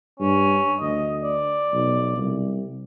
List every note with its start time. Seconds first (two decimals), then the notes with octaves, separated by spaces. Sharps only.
0.20 G2 C#4
0.80 D2 D#5
1.23 D5
1.73 B1
2.17 C2